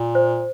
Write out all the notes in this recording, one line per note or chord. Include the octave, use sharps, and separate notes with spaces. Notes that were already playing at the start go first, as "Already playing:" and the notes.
Already playing: A#2
C5